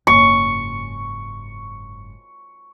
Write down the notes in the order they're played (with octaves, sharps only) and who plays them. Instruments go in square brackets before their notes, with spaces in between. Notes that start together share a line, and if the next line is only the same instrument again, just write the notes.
[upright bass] F#1 G#2 [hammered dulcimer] C#6